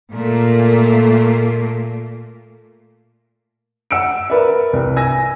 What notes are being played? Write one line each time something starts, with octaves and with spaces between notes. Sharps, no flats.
A#2 A3 A#3
F#5 E6 C#7 D7
A#4 B4 D5 E5
C2
G#5 E6 A#6